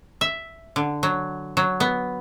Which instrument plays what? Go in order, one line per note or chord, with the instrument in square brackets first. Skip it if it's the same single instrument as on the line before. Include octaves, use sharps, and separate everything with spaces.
[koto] E5
D3
F#3
F#3
B3